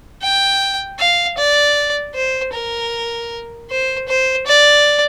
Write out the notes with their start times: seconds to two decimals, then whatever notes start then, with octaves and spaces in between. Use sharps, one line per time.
0.22 G5
0.99 F5
1.38 D5
2.15 C5
2.53 A#4
3.70 C5
4.08 C5
4.46 D5